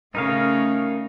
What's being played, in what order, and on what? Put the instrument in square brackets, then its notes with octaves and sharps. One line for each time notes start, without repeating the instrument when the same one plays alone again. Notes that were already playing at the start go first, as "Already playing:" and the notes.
[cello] C#3 A3 [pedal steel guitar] D#4 A#4 F5